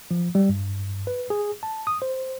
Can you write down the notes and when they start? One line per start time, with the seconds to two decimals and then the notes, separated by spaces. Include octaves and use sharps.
0.11 F3
0.35 G3
0.49 G2
1.07 B4
1.30 G#4
1.63 A5
1.87 D#6
2.02 C5